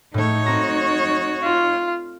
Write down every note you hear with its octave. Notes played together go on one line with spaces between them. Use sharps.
A2 A3 D#4 C#5
C4 F#4 A#5
F4